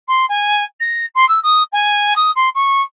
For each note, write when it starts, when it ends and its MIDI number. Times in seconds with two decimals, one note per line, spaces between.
0.08 0.25 84
0.29 0.63 80
0.80 1.06 94
1.15 1.27 84
1.28 1.39 88
1.43 1.63 87
1.72 2.13 80
2.16 2.31 87
2.35 2.49 84
2.55 2.81 85